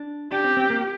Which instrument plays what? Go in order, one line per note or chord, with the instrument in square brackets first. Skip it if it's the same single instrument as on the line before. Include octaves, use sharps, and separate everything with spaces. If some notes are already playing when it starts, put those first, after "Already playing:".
Already playing: [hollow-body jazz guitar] D4
[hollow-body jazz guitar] D4 [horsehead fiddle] G4
[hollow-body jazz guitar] C4
C4
A#3